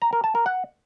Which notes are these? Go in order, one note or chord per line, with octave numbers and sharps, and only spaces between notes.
A#5
A#4
A5
A#4
F#5